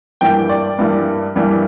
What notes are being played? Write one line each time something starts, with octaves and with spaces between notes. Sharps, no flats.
G2 E3 G3 A#3 G5
D5
G2 E3 G3 A#3
G2 E3 G3 A#3